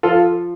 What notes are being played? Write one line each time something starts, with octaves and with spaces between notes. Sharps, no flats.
F3 F4 A4